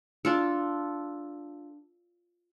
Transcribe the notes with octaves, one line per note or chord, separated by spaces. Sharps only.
D4 F4 A4